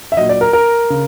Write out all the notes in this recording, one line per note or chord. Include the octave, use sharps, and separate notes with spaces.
E5
A#2 F#3 D#5
D5
A#4
A#4
C#3